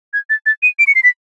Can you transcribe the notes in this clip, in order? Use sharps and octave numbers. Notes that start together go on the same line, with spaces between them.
G#6
A6
A6
D#7
D7
C#7
C7
B6